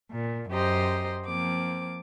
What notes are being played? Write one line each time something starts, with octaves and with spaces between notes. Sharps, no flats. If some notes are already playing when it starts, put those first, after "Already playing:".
A#2
F#2 G4 C5 D#5 A#5 C6
F3 A#3 C4 D6